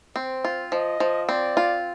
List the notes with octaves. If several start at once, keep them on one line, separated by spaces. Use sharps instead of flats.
C4 C5
F4
F3 D#5
F3
C4 D5
F4